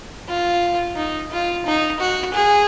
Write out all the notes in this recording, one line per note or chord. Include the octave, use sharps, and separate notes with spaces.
F4
D#4
F4
D#4
F#4
G#4